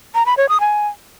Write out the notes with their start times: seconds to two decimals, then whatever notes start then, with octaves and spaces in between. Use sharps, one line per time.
0.15 A#5
0.26 B5
0.37 C#5
0.49 D#6
0.60 G#5